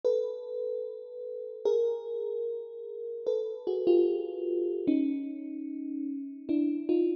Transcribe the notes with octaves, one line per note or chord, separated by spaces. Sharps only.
A4 B4
G#4 A#4
A4 B4
F#4 G#4
F4 G4
C#4 D#4
D4 E4
D#4 F4